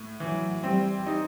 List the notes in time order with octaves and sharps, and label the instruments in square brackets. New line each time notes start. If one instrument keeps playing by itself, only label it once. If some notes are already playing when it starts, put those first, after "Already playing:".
Already playing: [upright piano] A2
[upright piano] E3 [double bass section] F#3
[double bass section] G3 [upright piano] C4
[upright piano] D#4